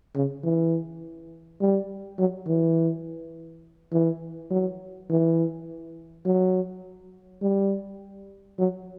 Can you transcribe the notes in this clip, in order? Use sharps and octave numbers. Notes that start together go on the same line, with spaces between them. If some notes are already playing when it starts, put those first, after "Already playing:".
C#3
E3
G3
F#3
E3
E3
F#3
E3
F#3
G3
F#3